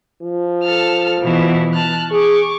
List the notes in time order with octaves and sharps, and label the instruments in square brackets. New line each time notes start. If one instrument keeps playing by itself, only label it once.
[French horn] F3
[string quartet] A4 A5 F6
B2 E3 E4
A5 F6 F#6
[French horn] G#4 [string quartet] C#6 D6